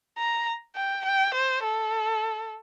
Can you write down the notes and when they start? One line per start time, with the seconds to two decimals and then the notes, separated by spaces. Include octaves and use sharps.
0.18 A#5
0.76 G5
1.05 G5
1.34 C5
1.63 A4